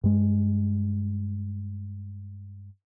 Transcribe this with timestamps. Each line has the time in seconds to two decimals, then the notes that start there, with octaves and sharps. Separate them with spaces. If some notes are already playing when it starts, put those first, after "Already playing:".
0.04 G2 G#3